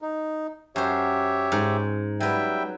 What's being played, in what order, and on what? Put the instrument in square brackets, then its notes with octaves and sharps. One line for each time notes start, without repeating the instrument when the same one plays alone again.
[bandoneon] D#4
[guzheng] F#2 C5 [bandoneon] G4 C#5 E5
[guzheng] G#2
[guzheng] F#3 B4 [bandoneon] G3 E5 G5